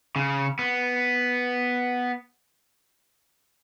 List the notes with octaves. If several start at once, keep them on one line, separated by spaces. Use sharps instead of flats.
C#3
B3